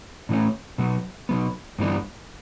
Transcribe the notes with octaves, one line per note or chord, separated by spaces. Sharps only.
A2 E3 A3 C#4
B2 F#3 B3
B2 F#3 B3
G2 E3 G3 B3 D4